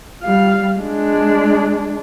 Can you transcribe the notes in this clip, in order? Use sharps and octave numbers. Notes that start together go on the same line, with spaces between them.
G3 F5
G#3 D4